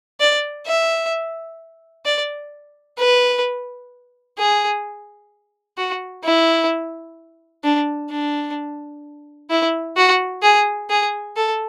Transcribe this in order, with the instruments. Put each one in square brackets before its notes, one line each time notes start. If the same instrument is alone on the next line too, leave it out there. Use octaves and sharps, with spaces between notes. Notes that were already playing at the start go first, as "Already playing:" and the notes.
[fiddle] D5
E5
D5
B4
G#4
F#4
E4
D4
D4
E4
F#4
G#4
G#4
A4